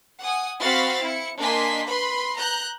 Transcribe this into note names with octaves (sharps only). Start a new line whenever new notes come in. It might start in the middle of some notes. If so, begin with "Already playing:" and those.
F#5 G#5 D#6
C4 F#4 F5 B5 A6 B6
E4 C#7
A#3 D4 D#5 G#5 C6 B6
B4 B5 C6
A#5 F#6 G6